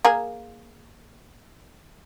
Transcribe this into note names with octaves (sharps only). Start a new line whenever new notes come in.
A#3 G#4 A#4